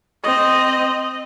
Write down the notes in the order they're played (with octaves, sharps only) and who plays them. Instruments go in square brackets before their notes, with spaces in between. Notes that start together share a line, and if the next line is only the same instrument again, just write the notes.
[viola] C4 D#5